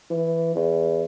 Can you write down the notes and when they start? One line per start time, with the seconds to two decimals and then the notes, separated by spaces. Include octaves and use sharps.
0.10 E3
0.56 E2